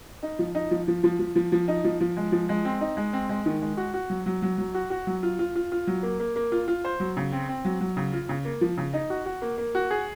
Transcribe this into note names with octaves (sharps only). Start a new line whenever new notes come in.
D#4
F3
D#4
F3
F3
F3
F3
F3
F3
D#4
F3
F3
G#3
F3
G#3
C4
D#4
G#3
C4
G#3
D#3
G#3
F#4
F#4
F#3
F#3
F#3
F#3
F#4
F#4
F#3
F4
F4
F4
F4
F#3
A#3
A#3
A#3
F4
F4
C5
F#3
C#3
C4
C4
F#3
F#3
C#3
F4
C#3
A#3
F3
C#3
D#4
F#4
F#4
A#3
A#3
F#4
G#4